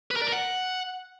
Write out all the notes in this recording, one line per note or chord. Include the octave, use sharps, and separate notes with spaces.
B4
A#4
D5
A#4
F#5